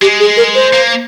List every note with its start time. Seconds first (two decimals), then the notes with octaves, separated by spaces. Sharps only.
0.01 G#3 G4
0.20 G#4
0.37 A#4
0.55 C5
0.73 A#3